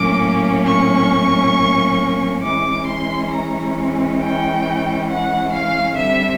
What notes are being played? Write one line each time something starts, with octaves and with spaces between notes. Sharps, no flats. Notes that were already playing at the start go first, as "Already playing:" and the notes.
Already playing: A2 F#3 A#3 C#4 D6
C#6
E3 G#3 C#4 D6
C6
A#5
G5
F#5
F5
D3 G3 C4 E5